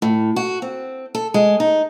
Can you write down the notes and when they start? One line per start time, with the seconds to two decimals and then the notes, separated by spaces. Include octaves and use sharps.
0.02 A2
0.36 F#4
0.62 C4
1.15 A4
1.34 G#3
1.60 D#4